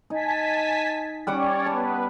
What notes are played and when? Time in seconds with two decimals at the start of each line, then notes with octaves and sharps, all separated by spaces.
0.10 D#4 G#5 A5 B6
1.27 G3 C#4 C#5 D5 F#5 D6
1.66 B3 B4 A5